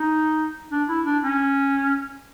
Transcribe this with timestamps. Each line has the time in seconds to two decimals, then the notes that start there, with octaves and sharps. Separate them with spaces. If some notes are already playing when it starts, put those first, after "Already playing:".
Already playing: D#4
0.71 D4
0.88 E4
1.06 D4
1.23 C#4